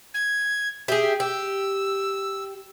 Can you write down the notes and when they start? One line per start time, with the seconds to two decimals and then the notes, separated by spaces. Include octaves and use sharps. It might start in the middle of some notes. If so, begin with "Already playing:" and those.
0.14 G#6
0.88 G4 G#4 E5
1.20 G4 E6